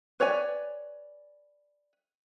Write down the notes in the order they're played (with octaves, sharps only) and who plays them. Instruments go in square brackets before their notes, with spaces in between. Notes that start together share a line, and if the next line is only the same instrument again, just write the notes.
[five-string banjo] B4 C#5 D5 G#5